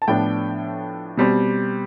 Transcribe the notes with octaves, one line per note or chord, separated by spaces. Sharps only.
A5
A2 F3 B3 D4 G5
B2 G3 C4